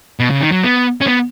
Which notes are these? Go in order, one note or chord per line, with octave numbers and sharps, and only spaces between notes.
B2
C#3
D#3
F#3
B3
C#4
B3